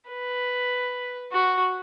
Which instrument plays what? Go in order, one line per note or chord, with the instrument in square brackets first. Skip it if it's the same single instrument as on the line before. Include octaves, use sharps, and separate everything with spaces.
[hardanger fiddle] B4
F#4